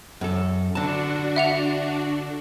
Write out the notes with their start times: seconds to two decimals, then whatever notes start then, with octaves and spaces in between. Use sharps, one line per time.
0.21 F#2 A4
0.75 D3 D4 F#4 A5
1.36 E5 F#5 F7